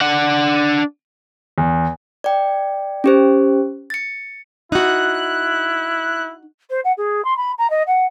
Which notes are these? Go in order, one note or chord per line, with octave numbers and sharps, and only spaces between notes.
D4 F#5
E2
D5 G5
C#4 G4 C5
A6 C#7
D#4 E4 F#4 F#6
C5
F#5
G#4
C6
B5
A#5
D#5
F#5